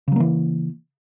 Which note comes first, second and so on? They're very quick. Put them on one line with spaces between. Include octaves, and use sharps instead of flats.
C#3 F#3 A#3 E3